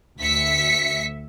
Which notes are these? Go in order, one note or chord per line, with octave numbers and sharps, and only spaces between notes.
D2 E5 B6 C#7